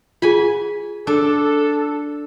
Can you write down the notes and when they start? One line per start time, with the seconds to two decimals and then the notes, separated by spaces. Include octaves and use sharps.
0.22 F4 G#4 G#5 B5
1.07 D4 A4